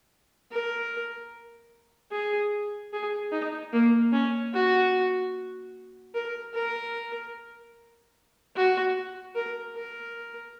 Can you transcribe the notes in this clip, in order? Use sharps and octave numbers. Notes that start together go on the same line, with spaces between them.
A#4
G#4
G#4
D#4
A#3
C#4
F#4
A#4
A#4
F#4
A#4
A#4